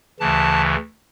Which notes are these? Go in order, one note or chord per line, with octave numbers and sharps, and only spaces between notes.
D2 C#3 E3 A5